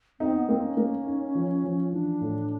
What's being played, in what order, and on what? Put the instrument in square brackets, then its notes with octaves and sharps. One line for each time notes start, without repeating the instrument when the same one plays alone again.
[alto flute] C4 [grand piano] D#4
[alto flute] B3
[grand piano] A#3 [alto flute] C4
[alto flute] C#4
[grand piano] A#3
D#4
F3
F3
[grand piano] E3 [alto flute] D4
[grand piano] A2